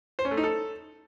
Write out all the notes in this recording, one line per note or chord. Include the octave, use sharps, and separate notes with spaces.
C5
C#4
A3
D#4
A4